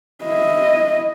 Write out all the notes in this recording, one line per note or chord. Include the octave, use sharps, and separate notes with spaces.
E4 D#5